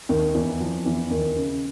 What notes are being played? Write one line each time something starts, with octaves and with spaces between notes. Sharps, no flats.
D#2 D#3
E2 E3
F2 F3
E2 E3
D#2 D#3
C#3